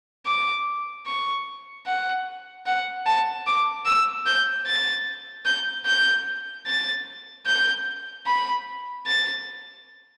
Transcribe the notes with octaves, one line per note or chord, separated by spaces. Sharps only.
D6
C#6
F#5
F#5
A5
D6
E6
G6
A6
G6
G6
A6
G6
B5
A6